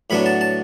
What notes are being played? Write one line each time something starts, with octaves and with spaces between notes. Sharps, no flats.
A2 F#3 B3 D4 B5
A5
A5